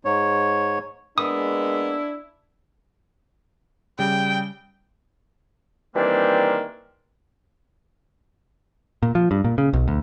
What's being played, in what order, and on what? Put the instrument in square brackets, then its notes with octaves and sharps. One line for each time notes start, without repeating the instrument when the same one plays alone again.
[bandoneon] G#2 C#5
[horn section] G#3 A#3 B3 [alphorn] D4 [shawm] E4 [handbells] D#6
[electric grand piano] C#3 G3 [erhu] G5
[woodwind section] D#3 E3 G3 A#3 C4 D4
[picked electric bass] A#2
F3
G2
A#2
C#3
B1
D2